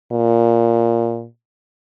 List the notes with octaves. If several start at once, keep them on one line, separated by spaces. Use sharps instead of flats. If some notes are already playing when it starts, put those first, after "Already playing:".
A#2